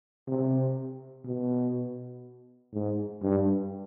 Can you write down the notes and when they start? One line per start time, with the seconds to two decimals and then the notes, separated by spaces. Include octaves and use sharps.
0.27 C3
1.25 B2
2.74 G#2
3.23 G2